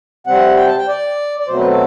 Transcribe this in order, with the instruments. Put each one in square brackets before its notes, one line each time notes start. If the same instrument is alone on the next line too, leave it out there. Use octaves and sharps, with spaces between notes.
[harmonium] C3 G3 C4 F#5
G5
A5
G5
D5
D5
B2 F#3 A3 C4 C5
B4
A4